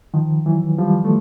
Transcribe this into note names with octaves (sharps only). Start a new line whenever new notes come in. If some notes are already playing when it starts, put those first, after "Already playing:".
D#3 F3
E3 F#3
F3 G3
A3